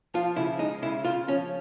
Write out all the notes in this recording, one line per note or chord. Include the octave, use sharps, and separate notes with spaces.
F3 F4
C#3 E4
G#3 D#4
C#3 E4
C#3 F4
F3 C#4